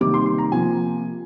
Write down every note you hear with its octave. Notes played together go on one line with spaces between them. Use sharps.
C3 D#3 G3 A#3 D6
C6
C6
A#5
C3 F3 A#3 G#5